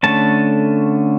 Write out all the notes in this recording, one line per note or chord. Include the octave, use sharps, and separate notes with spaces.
D3 A3 C#4 A5